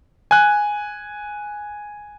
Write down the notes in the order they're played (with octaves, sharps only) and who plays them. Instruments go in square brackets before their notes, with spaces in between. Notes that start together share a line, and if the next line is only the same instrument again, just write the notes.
[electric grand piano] G#5 F#6